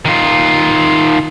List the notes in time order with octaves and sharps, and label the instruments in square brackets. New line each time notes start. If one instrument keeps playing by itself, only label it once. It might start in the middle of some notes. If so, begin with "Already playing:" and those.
[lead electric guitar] D#3 F4